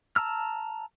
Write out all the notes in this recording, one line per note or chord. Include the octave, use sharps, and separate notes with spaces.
A5 A#5 E6 F6